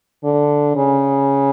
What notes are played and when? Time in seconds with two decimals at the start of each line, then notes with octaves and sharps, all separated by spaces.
0.24 D3
0.76 C#3